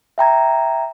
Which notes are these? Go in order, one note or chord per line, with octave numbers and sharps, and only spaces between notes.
E5 G5 A#5 G#6